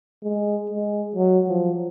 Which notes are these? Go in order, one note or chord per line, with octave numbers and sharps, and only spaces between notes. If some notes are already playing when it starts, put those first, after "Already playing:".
G#3
G#3
F#3
F3